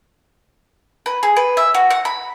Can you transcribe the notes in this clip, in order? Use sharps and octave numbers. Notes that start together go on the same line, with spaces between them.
B4
G#4
B4
E5
F#4
F#5
B5